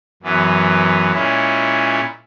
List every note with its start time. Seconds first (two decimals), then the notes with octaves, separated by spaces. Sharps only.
0.23 F#2 E3 B3
1.12 A#2 G#3 C#4 E4